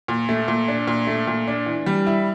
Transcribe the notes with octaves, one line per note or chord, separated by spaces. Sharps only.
A#2
A3
A#2
D4
A#2
A3
A#2
D4
E3
G3
E4